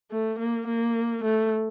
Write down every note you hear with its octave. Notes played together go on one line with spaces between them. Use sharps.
A3
A#3
A#3
A3